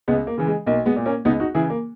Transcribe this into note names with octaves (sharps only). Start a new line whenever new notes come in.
C#2 G#3 B3
A#3
C#3 E3
G#3
B1 A#3
G#3 B3
A#2
A#3 C#4
C#2 B3 D#4
D#4 F#4
C#3 E3 E4 G#4
A#3